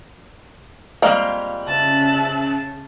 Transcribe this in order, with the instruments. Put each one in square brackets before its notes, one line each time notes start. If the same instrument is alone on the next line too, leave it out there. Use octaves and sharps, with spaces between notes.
[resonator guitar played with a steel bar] F2 F5 [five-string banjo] G3 G#3 A#3
[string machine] C#3 [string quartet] E5 A5 F#6